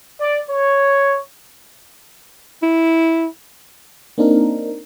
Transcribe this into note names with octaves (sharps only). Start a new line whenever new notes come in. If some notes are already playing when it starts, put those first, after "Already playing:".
D5
C#5
E4
A#3 C4 D4 D#4 A#4